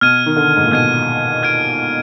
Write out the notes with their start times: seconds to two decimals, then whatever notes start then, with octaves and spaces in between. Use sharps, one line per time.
0.01 B2 F6 G#6 D#7
0.26 D#3
0.36 D3
0.56 G#2
0.64 A#2
0.72 B2 F6 G#6 D#7
1.43 F6 G#6 D7